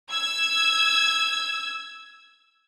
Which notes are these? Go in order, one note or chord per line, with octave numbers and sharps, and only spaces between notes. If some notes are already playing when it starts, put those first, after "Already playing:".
E6 G#6